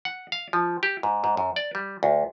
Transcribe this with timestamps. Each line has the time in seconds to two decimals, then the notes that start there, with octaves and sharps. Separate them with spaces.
0.05 F#5
0.32 F5
0.53 F3
0.83 G4
1.03 G#2
1.24 G#2
1.37 F#2
1.56 D5
1.75 G3
2.03 D2